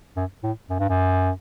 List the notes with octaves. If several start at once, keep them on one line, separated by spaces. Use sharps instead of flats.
F#2
A2
F#2
G2
F#2